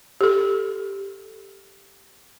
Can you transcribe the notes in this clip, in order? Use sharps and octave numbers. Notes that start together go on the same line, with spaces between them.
G4 A4